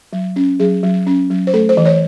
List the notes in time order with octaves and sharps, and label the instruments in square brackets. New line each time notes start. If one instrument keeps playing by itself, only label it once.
[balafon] F#3
C#4
F#3 G#4
F#3
C#4
F#3
C5
A3 A4
C5
E3
C#5